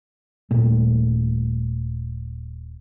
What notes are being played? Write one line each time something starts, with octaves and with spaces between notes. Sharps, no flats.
D#1 A#2 A3